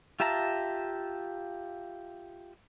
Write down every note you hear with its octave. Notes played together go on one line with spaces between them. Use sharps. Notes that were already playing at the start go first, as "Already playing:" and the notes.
F4 G4 E5 A5 A#5